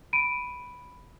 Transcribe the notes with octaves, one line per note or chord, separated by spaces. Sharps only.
B5 D7 D#7